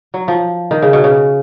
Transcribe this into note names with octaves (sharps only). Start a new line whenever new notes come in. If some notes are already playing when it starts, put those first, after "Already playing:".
F#3
F3
D#3
C#3
B2
C#3